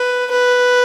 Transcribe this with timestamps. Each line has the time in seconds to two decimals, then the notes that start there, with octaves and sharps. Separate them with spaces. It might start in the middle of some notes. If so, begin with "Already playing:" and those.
Already playing: B4
0.31 B4